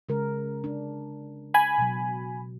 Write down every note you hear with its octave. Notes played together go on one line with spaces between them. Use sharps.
C#3 G#3 A#4
D4
G#5 B5
B2 F#3